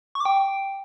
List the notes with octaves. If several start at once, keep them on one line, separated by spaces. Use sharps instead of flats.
C#6
D6
G5